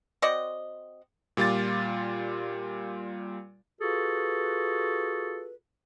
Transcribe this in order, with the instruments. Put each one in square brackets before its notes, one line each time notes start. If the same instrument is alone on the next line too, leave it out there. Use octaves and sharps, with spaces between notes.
[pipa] C4 F#4 D5 D#5
[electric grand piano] A#2 G3 F4 D6 A6
[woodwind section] F4 F#4 G#4 A4 B4